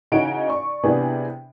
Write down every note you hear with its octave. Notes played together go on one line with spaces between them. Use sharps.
C#3 E3 D#4 F#4 C#5 D7
D5 C#6
C3 E3 B3 D4 G#4